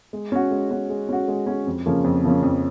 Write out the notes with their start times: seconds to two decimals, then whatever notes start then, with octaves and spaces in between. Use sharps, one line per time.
0.13 G#3
0.32 C#4 F#4
0.51 G#3
0.71 C#4 F#4
0.89 G#3
1.09 C#4 F#4
1.28 G#3
1.47 C#4 F#4
1.66 F2
1.86 C#3 F3 A#3 C#4
2.04 F2
2.24 C#3 F3 A#3 C#4
2.42 F2